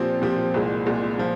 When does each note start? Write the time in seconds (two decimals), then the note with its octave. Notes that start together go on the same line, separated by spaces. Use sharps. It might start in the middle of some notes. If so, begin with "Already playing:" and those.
Already playing: A#2 F3 C4 G4
0.22 A#2 F3 C4 G4
0.54 C2 A#2 G#3
0.86 C2 A#2 G#3
1.19 A#2 F3